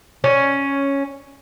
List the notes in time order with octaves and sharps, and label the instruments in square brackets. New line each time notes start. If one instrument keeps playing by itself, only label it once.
[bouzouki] C#4